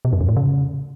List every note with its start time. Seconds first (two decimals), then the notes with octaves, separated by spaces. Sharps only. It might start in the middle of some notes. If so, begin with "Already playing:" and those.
0.05 B2
0.13 F#2
0.21 F2
0.29 A2
0.37 C#3